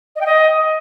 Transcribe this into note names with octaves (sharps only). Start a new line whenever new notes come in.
D#5
G5
D#5